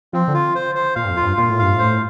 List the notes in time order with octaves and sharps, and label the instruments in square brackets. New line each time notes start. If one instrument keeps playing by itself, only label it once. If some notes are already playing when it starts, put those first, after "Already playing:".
[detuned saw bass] F3 [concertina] C4
[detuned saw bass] D3
[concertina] F4
C5
C5
[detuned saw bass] A#2 [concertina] F5
[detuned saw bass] G2
F2
[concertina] F4
[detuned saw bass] G2
[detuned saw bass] A#2 [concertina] F4
[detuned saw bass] A2
[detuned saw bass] G2 [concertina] F5
[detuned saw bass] A2 [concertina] C5